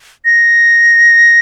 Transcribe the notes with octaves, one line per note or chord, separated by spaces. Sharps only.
A#6